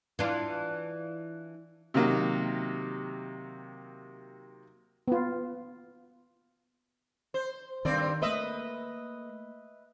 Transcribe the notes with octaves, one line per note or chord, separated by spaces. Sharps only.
E3 D4 F4
C3 D#3 F#3 A#3
B3 F4
C5
G2 D#3 C4 D5
A3 A#3 B4 D#5 E5